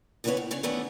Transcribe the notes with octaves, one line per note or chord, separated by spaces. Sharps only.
D2 C#3 E3 B3 B4 C#5
A2
G2 C#3 C#4
D#3 E3 A3 B3 C#4 D4